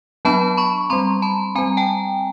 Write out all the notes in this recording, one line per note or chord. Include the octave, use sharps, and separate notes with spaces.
F#3 B3 D4 A5 B5
B5 C#6
G3 C4 A#5 C6
A5 B5
G3 C4 G#5 A#5
G5 A5